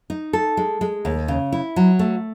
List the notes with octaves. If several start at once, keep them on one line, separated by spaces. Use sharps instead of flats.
D#4
A4
G#3
G#3
D#2
C#3
E4
F#3
A3